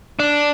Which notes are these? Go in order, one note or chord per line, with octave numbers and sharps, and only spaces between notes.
D4